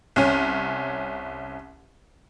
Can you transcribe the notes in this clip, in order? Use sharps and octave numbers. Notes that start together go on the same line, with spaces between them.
C2 C#4